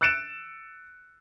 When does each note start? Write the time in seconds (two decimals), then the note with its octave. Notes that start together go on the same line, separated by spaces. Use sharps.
0.01 E6 F#6 A6 C#7 D7 E7